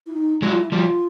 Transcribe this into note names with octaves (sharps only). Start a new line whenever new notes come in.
E4
D#4
F#3 G#3 E4
F4
E4
F3 G3 F4